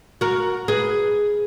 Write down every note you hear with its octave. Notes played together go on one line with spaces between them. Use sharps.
F#4 A#4
G#4 B4